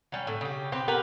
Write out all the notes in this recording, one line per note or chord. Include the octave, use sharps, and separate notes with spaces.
F#3 G3 C#4
A2 D3
C#3 G4
C4 G4 B4 C5
B3 G4 A#4 B4